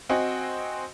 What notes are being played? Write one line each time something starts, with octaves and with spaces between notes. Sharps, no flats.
C4 F#4 D#5 G#5